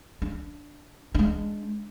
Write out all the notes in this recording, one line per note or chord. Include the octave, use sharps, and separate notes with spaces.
D4
G#3 D4